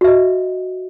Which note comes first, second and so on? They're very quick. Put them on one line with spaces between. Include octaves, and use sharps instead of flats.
F#4 E5 D#5